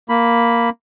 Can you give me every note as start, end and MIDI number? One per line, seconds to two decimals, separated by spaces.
0.09 0.70 58
0.09 0.70 83